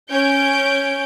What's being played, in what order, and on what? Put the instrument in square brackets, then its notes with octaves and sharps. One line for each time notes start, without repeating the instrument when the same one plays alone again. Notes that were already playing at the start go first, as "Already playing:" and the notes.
[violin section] C#4 G6 D7